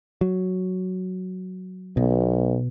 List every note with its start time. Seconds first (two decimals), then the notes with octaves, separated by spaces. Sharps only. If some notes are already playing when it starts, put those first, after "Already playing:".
0.21 F#3
1.97 B1 B2